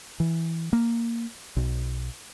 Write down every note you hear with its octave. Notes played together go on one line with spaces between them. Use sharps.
E3
A#3
B1